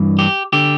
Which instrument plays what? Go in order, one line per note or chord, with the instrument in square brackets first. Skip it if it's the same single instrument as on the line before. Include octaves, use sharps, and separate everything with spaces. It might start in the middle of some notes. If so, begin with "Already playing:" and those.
Already playing: [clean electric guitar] G2 E3
G4
D3 G4